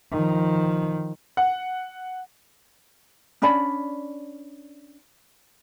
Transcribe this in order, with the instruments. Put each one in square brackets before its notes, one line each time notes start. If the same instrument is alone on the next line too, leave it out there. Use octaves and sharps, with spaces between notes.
[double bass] D#3 F3
[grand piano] F#5
[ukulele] C#4 D4 D5 B5